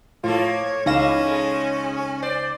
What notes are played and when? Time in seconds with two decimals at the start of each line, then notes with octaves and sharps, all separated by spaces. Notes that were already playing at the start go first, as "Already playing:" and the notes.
0.24 A2 F3 A#3 F4 A4 C#5
0.86 C#2 C#3 E3 C#4 D#4 F5 A#6 E7
1.25 G#3 A3
2.22 C5 D5